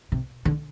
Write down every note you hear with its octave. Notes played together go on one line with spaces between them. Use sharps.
C3
D3